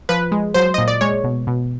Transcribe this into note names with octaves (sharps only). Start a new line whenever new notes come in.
F3 B4
G#3
F#3 C5
A#2 D#5
D5
G#3 C#5
B2
B2